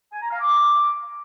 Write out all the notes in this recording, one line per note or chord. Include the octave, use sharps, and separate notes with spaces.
G#5
A#5
F5
D6